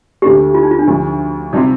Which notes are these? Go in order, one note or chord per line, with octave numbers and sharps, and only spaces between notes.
D2 D3 A3 D4 G4
F4
D#4
F4
D4
D2 D3 F3
C3 G3 C4 D#4 F4